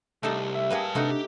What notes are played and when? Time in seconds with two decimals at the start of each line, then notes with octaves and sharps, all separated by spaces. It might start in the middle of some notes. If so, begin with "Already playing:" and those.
0.23 C2 A3 D#4 G4 A4
0.55 E5
0.70 G3 A#3 G#4 B4 A5
0.95 C3 A3 D4 D#4 F#4
1.10 G4